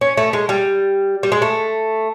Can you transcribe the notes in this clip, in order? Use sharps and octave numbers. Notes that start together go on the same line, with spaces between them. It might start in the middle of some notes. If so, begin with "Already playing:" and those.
C#4
A3
G#3
G3
G3
G#3
A3